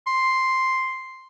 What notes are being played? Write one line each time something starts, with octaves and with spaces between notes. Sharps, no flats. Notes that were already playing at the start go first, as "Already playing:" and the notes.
C6